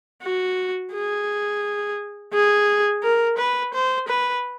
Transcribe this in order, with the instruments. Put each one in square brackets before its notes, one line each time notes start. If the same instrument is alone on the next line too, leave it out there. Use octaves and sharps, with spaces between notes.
[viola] F#4
G#4
G#4
A#4
B4
C5
B4